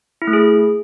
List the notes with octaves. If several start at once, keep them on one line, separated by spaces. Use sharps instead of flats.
E4
A3
G#4